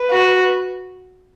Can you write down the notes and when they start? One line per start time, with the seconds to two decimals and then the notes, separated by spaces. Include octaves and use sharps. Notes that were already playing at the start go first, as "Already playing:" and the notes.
Already playing: B4
0.10 F#4